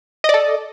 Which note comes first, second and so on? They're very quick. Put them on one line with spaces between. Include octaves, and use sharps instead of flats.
D#5 D5 A4